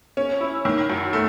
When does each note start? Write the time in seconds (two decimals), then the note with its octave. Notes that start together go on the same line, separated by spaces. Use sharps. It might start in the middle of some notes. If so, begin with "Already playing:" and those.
0.17 C#4
0.40 E4
0.65 D#3
0.90 F#2
1.13 A3